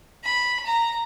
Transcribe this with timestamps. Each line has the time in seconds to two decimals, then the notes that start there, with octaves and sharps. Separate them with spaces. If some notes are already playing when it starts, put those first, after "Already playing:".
0.24 B5
0.66 A#5